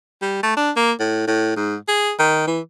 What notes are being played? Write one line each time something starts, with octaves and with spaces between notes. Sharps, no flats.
G3
A3
D4
A#3
A2
A2
G#2
G#4
D#3
E3